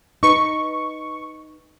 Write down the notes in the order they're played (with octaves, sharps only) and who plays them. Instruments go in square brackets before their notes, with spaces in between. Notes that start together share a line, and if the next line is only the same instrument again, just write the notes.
[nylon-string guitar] D#4 B4 [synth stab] C#6